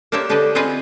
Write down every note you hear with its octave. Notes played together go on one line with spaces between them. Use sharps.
A#3 D4 G4 C5 C#5 E5
D3 D4 G4 B4 D#5
B3 C4 F4 G#4 B4 D#5